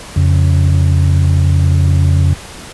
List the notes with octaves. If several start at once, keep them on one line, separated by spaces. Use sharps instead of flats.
F2 C#3